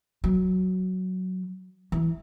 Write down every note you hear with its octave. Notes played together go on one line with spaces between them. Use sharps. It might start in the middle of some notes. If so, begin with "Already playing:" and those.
F#3
E3